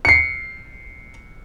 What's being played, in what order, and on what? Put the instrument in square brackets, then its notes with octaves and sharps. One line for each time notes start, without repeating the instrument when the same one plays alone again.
[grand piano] C7 C#7